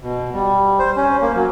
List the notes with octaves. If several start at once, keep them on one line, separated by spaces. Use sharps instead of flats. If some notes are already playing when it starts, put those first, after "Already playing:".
B2
G3
C5
C#4
A#3
F#3